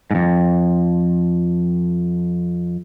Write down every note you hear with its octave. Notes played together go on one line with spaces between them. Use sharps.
F2 G#2